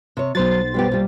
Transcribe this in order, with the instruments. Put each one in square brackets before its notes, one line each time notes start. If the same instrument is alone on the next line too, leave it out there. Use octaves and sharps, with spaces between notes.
[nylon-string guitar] C3 C#5
[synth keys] B1 C5 A6 [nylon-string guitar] F#3
[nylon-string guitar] G3 B3 G4
A#2 G3